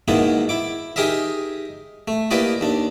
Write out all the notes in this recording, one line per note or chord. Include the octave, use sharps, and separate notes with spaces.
G#2 B2 D#3 A#3 B3 E4
E4 D6
D#4 G4 G#4 A#4 D#5 E5
A3
A#3 E4 G4 B4 D5 D#5
D#2 D4